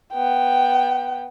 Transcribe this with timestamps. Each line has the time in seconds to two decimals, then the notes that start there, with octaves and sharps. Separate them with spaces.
0.13 B3 G5